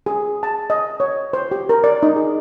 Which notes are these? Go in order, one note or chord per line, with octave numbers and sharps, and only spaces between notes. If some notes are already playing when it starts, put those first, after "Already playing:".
G#4
A5
D#5
C#5
C5
G4
A#4
D5
D#4
G#4